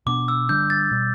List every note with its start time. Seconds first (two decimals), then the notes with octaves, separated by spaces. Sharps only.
0.06 B2 B3 D4 D6
0.28 E6
0.49 D3 G3 D4 G6
0.70 A6
0.91 B2 G3